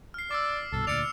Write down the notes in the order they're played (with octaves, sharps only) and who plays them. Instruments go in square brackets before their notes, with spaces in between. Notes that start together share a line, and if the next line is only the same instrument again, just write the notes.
[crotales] F6 C7
[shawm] D5 [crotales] D6 E6
[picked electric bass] C2 G2 B2 [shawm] A4
[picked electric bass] D2 A#2 [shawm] D5 [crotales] F6 C#7 F7